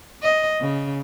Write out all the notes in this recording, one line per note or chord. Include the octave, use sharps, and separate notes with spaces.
D#5
C#3